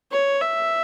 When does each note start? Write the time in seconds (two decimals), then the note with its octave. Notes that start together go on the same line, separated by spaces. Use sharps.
0.11 C#5
0.41 E5